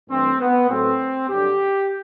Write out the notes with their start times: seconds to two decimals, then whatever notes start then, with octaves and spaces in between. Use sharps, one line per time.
0.09 G2 E3 A3 C4
0.40 B3
0.69 A2 F#3 A3 C4
1.28 G2 D3 F#3 G4